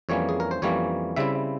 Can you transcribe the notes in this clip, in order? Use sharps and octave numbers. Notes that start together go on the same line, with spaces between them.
F2 E3 G3 A#3 C#4 C#5
G#4
A#4
C5
F2 E3 G3 A#3 C#4 C#5
C#3 G3 C4 E4 E5